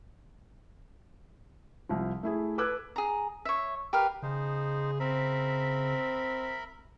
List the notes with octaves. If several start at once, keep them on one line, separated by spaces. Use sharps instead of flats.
C2 F3
A3 E4 G#4
A4 B4 D6 E6 F#6 G#6
G#4 A#5
C#5 E5
G4 A#4 B4 F5
C#3 D#4 G#4 C5
C4 A#4 E5 B5